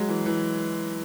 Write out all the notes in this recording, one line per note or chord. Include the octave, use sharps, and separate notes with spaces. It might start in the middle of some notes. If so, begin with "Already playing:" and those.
Already playing: F#3 G#3
E3
E3